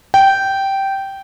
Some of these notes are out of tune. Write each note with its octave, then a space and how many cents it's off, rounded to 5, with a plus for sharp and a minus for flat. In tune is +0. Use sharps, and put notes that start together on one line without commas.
G5 -10